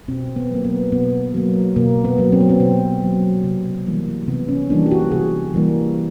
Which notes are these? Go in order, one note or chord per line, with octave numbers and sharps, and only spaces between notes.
B2 C4
B3
F#3 A#3
B3
B2 B3
F#3 A#3
B2 A#3
B3
F#3 A#3
C4
B3
C4
B2 C4
F#3 A#3
C3
E3 G3 A#3
C3 B3
C#4
E3 G3 A#3 D4
G4
F#4
C3 G#4
E3 G3 A#3